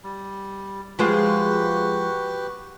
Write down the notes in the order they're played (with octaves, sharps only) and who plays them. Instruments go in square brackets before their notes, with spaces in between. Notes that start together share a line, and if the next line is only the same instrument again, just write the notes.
[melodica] G3
[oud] F3 G#3 C5 [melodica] F#4 G4 B4